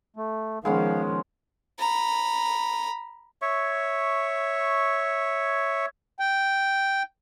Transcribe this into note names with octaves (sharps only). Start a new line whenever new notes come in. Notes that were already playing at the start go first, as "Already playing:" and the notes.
A3
D#3 F3 G#3 B3 C#4 F5
A#5 B5
C#5 E5 C#6
G5